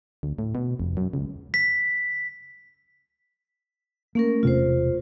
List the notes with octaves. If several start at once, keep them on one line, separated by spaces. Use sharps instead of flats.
D2
A2
B2
F1
F#2
C#2
B6
A3 A#3 C#4 A#4
E1 C3 A3 F4 C5